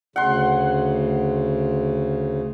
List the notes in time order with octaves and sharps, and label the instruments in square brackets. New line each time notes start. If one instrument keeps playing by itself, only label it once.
[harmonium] D2 C#3 [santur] F#5 C6